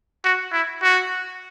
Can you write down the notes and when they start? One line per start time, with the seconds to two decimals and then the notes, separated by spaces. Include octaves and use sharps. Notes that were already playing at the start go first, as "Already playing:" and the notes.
0.24 F#4
0.52 E4
0.83 F#4